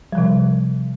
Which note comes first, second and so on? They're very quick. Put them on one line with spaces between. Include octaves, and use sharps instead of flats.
G3 F3 C3